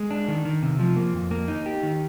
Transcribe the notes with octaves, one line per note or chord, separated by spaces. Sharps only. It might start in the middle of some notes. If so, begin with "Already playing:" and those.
Already playing: G#3
D4
D#3
D#3
C3
F3
A#3
F2
A#3
D#4
G4
D#3